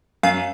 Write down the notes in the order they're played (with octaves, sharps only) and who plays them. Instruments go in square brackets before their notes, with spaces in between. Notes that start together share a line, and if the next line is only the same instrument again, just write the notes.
[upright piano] F#2 [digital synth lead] F5